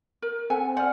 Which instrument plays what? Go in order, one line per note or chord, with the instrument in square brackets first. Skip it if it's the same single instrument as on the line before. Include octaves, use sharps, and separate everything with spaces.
[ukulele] A#4
[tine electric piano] C4 A4 F#5 [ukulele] G#5
[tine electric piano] C5 D5 F6 [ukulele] F#5